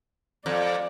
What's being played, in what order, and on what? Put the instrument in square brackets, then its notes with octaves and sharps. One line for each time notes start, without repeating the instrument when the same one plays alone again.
[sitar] F2 [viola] D5